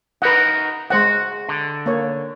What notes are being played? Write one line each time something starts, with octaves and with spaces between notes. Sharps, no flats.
D#4 F#4 A#4 B4 F#5
G#3 F#4 C5 F#5
D3
A#3 C#5